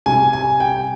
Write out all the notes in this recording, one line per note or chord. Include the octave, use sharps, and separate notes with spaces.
C3 G3 G#5
G#5
G5